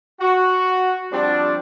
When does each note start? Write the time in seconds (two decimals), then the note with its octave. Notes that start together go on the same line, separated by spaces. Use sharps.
0.20 F#4
1.11 F3 G3 C4 D4